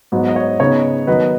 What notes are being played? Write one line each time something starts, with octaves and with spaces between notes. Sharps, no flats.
G#2 F#3 B3 D#4
D#5
C#5
C#3 B3 D#4 C#5
D#3 F#3 B3 D#4 B4 D#5